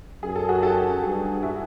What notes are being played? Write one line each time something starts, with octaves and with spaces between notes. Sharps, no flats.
F#2 G#4
A4
F#4 G#4
G4 A4
G2 F#4 G#4
E4 F#4